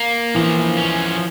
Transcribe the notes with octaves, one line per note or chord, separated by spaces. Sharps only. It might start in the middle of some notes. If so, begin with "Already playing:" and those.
Already playing: A#3
E3 F3
C#4